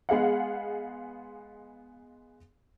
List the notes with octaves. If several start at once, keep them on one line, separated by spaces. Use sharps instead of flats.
G#3 B3 G#4 F5 F#5